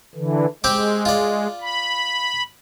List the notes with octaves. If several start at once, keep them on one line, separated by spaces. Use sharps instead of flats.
D3 E3
G#3 C4 G4 D6
F4 D5
B5